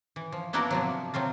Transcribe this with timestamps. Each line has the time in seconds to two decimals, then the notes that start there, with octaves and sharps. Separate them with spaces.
0.16 E3
0.32 F3
0.53 A#3 B3 D4 E4 F#4 A#4
0.70 C3 F3 F#3
1.14 C3 F#3 C4 F4